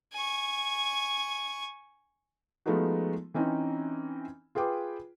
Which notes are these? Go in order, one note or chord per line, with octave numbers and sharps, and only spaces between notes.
G#5 C#6
F3 G#3 A3 B3 D#4 F#4
E3 C4 C#4 D#4
F4 G#4 B4 G5 D6